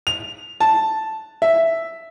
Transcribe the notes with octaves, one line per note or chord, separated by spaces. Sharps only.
F7
A5
E5